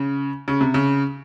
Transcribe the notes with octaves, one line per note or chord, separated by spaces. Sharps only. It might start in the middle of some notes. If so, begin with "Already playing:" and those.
Already playing: C#3
C#3
C3
C#3